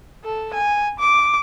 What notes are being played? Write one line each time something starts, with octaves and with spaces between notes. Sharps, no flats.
A4
G#5
D6